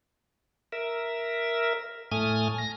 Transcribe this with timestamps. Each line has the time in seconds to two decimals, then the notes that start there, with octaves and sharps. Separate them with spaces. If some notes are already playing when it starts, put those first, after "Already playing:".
0.72 A#4 E5
2.11 A2 A3 G#5 D#6 F6
2.58 A#6